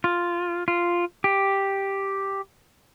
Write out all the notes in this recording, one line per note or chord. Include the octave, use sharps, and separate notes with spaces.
F4
F4
G4